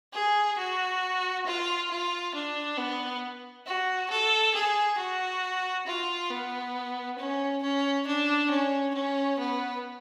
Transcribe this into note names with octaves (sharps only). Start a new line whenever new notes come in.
G#4
F#4
F4
F4
D4
B3
F#4
A4
G#4
F#4
F4
B3
C#4
C#4
D4
C#4
C#4
B3